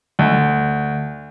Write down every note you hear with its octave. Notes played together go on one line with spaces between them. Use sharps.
D2